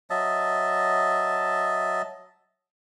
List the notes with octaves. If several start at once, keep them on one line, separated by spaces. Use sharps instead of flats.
F#3 D#5 E5 A5